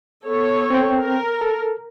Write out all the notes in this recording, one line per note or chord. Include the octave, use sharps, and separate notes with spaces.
B3 A4 C#5
C4 G5
A#4
A4